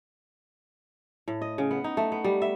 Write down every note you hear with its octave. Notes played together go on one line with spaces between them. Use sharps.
A2
D#5
C#3
B3
D#4
A3
B3
G3
E5